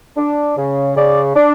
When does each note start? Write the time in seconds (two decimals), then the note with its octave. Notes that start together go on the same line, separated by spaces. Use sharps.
0.17 D4
0.57 C#3
0.96 C#3 D5
1.36 D4